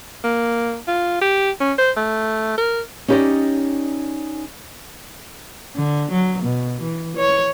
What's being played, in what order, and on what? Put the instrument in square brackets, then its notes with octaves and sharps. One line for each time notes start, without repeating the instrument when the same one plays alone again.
[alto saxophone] A#3
F4
G4
C#4
C5
A3
A#4
[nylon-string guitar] C#4 D#4 G4 B4 D5 D#5
[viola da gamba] D3
F#3
B2
E3
C#5